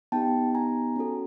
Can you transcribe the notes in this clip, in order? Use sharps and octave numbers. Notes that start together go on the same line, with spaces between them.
B3 D#4 G4 G5 A5
G#5 A#5
C#4 F#4 A4